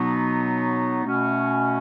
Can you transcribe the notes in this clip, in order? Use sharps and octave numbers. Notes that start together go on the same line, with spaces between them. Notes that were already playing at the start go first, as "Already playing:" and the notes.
Already playing: B2 F#3 B3 D#4
B2 A3 C#4 F#4